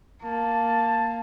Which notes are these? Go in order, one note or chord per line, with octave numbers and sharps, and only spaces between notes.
A#3 A5